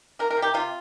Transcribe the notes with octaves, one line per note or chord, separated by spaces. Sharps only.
A#3 A#4
A#4
C3
G4
C3 F4